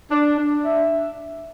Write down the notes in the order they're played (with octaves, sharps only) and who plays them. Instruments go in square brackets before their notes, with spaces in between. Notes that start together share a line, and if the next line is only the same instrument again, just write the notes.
[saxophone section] D4
D4
E5